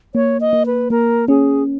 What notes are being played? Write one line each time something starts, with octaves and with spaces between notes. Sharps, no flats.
A#3 C#5
D#5
A#3
B4
A#3 A#4
C#4 G#4